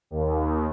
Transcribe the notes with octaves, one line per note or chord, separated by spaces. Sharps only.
D#2